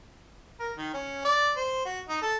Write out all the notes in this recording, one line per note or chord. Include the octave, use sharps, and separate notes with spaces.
A#4
D#3
C#4
D5
C5
F#4
D#4
A4